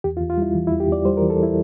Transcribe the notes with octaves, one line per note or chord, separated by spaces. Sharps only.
E2 G4
F4
E2
F4
G3 E4
E3
E4
E2
G4
E2 D5
G3 C5
A#4
E3
A4
E4